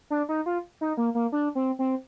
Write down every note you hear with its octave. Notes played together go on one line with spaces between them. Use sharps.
D4
D#4
F4
D#4
A#3
A#3
D4
C4
C4